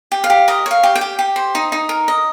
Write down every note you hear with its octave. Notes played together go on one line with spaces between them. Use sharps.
G4
F5
G4
A#4 D#5
C#5 F5
G4
G5
G4
G4
C5
D#4
D#4
A#4
D#5